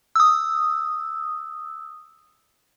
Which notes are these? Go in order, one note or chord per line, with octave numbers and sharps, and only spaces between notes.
D#6 E6